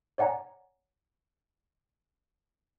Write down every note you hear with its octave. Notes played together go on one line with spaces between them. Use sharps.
C#5 D5 F#5 G#5 A#5